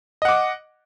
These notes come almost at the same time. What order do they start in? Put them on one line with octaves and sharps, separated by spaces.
D#5 F#5 D6